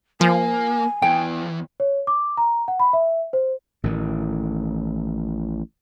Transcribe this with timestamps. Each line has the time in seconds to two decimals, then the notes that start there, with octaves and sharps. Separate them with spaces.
0.21 F3 A#3 G#5
1.02 E2 E3 G5
1.80 C#5
2.07 D6
2.37 A#5
2.68 F#5
2.80 B5
2.93 E5
3.33 C5
3.84 A1 A2 D#3